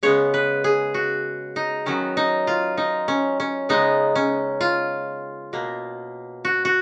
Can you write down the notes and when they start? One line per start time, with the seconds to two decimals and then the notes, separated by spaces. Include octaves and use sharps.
0.03 C#3 G#3 B3 C#5
0.34 B4
0.64 G#4
0.94 F#4
1.56 D#4
1.86 D#3 F#3 B3 C#4
2.17 D#4
2.47 F4
2.77 D#4
3.08 C#4
3.40 C#4
3.69 C#3 G#3 B3 D#4
4.16 C#4
4.61 F4
5.53 B2 A#3
6.45 F#4
6.65 F#4